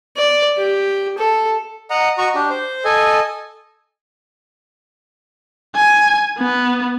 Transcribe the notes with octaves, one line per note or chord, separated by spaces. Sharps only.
D5
G4
A4
D#5 F#5 A#5
F#4 D#5 A#5 C#6
D4 G4
C5
A4 D#5 G#5
G#5
B3